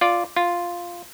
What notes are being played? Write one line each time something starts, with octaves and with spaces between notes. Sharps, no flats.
F4 D5
F4